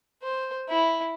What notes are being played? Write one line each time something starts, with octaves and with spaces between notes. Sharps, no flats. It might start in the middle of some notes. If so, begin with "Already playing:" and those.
C5
E4